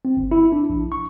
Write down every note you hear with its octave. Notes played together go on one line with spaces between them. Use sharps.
C4
G1
E4
D4
A#1
C#6